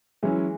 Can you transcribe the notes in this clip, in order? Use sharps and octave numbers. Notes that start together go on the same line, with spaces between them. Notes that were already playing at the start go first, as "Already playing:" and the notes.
E3 F#3 G#3 C#4 E4